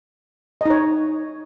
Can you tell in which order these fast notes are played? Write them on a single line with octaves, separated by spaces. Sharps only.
D#5 D#4 C#5